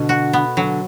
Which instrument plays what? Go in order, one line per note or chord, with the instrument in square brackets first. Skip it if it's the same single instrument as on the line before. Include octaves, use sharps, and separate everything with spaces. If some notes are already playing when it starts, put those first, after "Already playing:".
Already playing: [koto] B2 [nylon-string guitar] D3
[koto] F#4
B3
[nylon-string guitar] D3 [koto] F#3